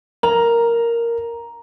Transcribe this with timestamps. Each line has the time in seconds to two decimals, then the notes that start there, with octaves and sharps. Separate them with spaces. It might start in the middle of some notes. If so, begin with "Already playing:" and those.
0.23 A#4 A#5